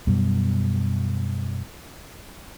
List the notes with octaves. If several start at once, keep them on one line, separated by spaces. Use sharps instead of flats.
F#2 B2 G3